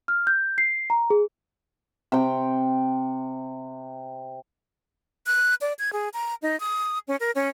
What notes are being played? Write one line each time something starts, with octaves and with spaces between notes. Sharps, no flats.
F6
G6
C7
A#5
G#4
C3 G5
F#6
D5
G#6
G#4
A#5
D#4
D#6
C#4
A#4
C#4